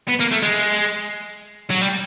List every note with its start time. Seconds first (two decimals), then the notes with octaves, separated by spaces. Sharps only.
0.09 B3
0.21 A#3
0.32 A3
0.43 G#3
1.70 F#3
1.81 G3